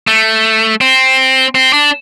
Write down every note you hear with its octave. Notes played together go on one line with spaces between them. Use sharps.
A3
C4
C4
D4